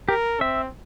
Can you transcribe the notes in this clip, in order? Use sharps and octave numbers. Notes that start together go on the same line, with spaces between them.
G4 A#4
C4 E5